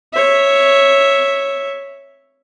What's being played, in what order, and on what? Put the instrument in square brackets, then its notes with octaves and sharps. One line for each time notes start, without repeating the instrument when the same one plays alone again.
[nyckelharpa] C#5 E5